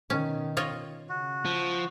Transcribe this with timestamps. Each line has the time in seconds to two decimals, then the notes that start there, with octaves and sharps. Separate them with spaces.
0.10 B2 D#3 C#4
0.57 F4 C#5 D#5
1.09 C#3 F#4
1.45 F3